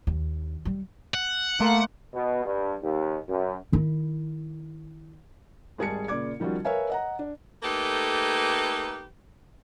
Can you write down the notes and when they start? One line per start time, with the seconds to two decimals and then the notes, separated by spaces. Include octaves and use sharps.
0.07 D#2
0.65 G3
1.14 F#5
1.60 A3 A#3 C6
2.14 B2
2.45 G2
2.82 D#2
3.28 F#2
3.72 D#3 E4
5.78 G#1 G3 G#4 A5 G#6 C#7
6.08 A#2 C#3 D5 D6 G#6
6.40 D#3 F3 G3 C#4 F#4
6.65 A#4 B4 C#5 E5 F5 G#5
6.90 D#5 F#5 A#5
7.19 D4
7.63 A3 A#3 D#4 G4 A4 B4